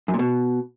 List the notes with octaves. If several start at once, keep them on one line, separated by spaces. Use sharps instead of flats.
F#2
A#2
B2